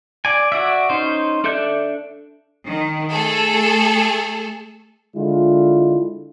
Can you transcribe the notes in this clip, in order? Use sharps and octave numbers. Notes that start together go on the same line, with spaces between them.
D5 G#5
F#4 D5 E5
C#4 D#4 C5
D4 A4 D5 E5 G6
D#3
A3 G#4 A4
D3 G#3 E4 F4